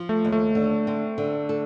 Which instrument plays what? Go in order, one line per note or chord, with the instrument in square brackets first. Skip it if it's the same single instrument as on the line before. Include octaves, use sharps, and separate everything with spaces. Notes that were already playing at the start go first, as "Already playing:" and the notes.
Already playing: [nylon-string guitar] F3
[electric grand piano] A3
[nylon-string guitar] D#2
[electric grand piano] A3
[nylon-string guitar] D3
C4
D3
A4